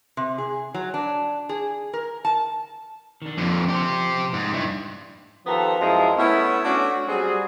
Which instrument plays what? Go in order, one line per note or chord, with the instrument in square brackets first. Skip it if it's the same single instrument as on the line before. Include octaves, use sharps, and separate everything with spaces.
[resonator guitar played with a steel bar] C3
G#4
F#3
D4
G#4
A#4
A5
[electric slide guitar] D#3 D4
[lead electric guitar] F2 D3 [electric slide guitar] F3
[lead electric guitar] G4 C5
G#2
[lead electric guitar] G2 [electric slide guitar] E4
[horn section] D#3 F3 B3 G4 A4 A#5
F#2 F3 G#3 E4 G#4 A#5
A3 B3 C#4 E4
A3 C#4 D4 F#4
F#3 G3 C4 F#4 G#4